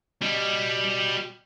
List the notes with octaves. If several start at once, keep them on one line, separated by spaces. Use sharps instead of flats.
G3 F#4 D#5